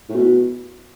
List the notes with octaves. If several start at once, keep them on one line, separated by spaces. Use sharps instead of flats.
A2
B2